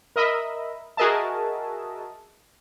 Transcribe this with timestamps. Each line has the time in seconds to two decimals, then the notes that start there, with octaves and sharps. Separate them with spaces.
0.16 A#4 D#5 E5 B5
0.97 F#4 G#4 A#4 D#5 E5 A5